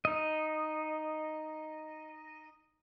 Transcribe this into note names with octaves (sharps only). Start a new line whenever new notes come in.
D#4 D#5